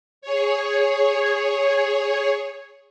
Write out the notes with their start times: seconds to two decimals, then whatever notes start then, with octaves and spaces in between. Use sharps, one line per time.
0.22 G#4 C#5